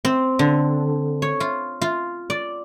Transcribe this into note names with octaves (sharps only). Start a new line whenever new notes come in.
C4
D3
C#5
F4
F4
D5